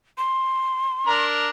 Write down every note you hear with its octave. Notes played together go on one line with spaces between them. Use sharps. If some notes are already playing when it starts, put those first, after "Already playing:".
C6
D4 A#4 A#5